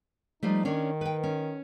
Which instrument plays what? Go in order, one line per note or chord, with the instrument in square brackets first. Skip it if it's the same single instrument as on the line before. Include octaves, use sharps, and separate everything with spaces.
[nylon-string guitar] F3 G3 A3 [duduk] D#4
[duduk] D#3 [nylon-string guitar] C#4 D4 C#5
[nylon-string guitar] B4 G5
C#4